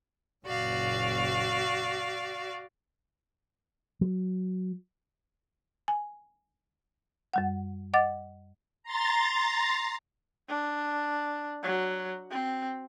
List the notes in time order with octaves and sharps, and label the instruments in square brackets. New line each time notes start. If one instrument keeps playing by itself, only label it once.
[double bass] F#1 A#2 [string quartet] F#4 D5 F5
[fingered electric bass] F#3
[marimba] G#5
F#2 G3 F#5
D#5 F#5 D6 A6
[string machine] A#5 C6 A6
[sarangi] D4
F#3
C4